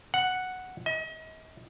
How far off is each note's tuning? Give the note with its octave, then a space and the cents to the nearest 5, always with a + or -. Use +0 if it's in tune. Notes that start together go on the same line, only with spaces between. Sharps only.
F#5 +0
D#5 +40